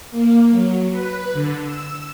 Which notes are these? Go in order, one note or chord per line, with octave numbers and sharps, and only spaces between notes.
A#3
F#3
B4
D3
E6